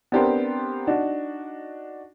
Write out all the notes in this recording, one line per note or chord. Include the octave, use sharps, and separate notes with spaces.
B3 C4 D4 G4 A#4 C5
D4 D#4 F#4